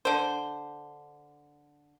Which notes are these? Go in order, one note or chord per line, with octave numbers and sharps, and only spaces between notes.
D3 C5